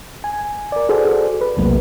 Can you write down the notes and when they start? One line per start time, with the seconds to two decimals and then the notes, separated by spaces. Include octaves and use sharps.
0.24 G#5
0.72 A#4 D5
0.89 F#4 G#4 A4 C5 D5
1.41 B4
1.57 B1 E2 C3 F#3 A3 A#3